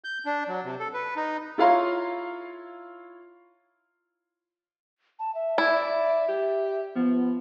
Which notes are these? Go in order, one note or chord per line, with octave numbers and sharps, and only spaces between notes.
G6
D4
F#3
C3
A4
B4
D#4
E4 F4 C#5 F5 A#5 C6
A5
E5
E4 D5
G4
F3 B3